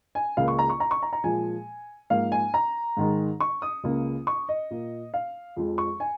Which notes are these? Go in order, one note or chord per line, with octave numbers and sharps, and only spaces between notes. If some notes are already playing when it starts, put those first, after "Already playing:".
G#5
C#2 C#3 A#3 F5
C#6
A#5
C#6
A#5
C#6
A#5
A#5
A#2 F3 G#3 G#5
G#2 F3 A#3 F5
G#5
A#5
G#2 D#3 G#3
C#6
D#6
C#2 C#3 A#3
C#6
D#5
A#2 A#3
F5
F2 F3 G#3
C#6
G#5